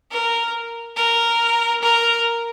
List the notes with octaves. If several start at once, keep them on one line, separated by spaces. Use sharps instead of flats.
A#4
A#4
A#4